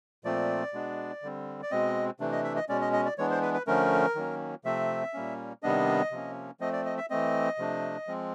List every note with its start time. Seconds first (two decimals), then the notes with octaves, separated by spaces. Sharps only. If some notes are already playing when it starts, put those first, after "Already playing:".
0.24 A#2 F3 A3 C4 D5
0.73 B2 G#3 B3 D4
1.22 D3 G3 C4
1.62 D5
1.71 B2 G#3 C4 D#5
2.19 C3 E3 A3 D4
2.32 D#5
2.44 E5
2.56 D#5
2.69 B2 G#3 C#4 D5
2.81 D#5
2.93 D#5
3.05 D5
3.18 E3 G#3 B3 D4 C#5
3.30 C5
3.42 B4
3.54 B4
3.67 D3 F3 A3 C#4 A#4
4.15 D#3 F#3 A#3 C#4
4.64 C3 F3 A3 C4 E5
5.13 A#2 G3 A#3 C#4
5.63 C3 D#3 G3 B3 D4 D#5
6.11 C3 F3 A#3 C#4
6.60 F3 A3 C4 D#5
6.73 D5
6.86 D#5
6.97 E5
7.10 E3 A3 C4 D#5
7.58 C3 F3 A3 D4
8.07 F3 G#3 C4